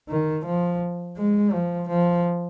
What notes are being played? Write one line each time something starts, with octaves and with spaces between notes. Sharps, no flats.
D#3
F3
G#3
F3
F3